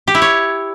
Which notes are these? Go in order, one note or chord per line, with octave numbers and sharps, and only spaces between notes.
G4
E4
C#5